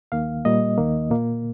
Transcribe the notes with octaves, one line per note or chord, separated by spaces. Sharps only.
D#2 D#3 A#3 F5
A#2 G3 A#3 D#5
D#2 D#3 A#3
A#2 A#3